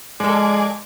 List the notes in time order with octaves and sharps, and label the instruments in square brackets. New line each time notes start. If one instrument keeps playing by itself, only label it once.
[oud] F3 A4 [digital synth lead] G#3 [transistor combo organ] G#4 D5